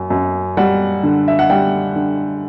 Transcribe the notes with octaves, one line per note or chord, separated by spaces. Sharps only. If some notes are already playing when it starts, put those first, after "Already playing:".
Already playing: F#2
F#2
G3 F#5
D3
E5
F#5
G3 G5
D3